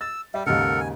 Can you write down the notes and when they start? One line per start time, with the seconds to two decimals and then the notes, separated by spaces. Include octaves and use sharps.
0.01 E6 A6
0.34 G3 E5
0.46 D#2 G#2 C#3 A4 A#4 F#5
0.80 G#5